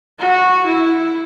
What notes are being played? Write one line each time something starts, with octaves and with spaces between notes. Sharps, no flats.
F#4
E4